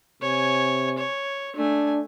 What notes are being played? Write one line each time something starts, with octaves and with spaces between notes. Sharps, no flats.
C3 C#5 G#5
C#5
A3 D4 G#5